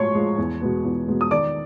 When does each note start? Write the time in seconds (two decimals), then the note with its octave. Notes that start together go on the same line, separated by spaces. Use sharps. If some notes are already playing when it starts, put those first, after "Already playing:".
Already playing: A2 F3 G#3 C#5 C6 C#6
0.15 F3 G#3
0.38 E2
0.61 B2 G#3 B3
0.85 E2
1.08 B2 G#3 B3
1.21 D#6
1.31 D#3 D5 D6